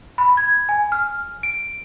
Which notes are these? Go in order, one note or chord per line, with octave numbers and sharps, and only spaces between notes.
B5
G#6
G#5
F6
D7